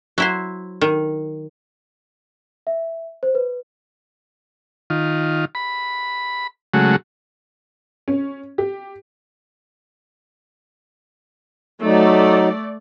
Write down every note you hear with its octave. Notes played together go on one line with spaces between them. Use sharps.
F#3 E4 C5
D#3
E5
C5
B4
D#3 F4
B5
C#3 F#3 G#3 A3 F#4
C#4
G4
F#3 A3 D#4 D5